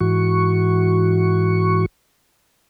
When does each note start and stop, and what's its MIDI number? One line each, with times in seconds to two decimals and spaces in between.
0.01 1.86 44
0.01 1.86 52
0.01 1.86 66
0.01 1.86 85